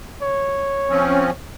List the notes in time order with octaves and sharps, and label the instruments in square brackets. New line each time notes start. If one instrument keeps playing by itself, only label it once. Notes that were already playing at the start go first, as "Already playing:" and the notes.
[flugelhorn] C#5
[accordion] F3 C4 C#4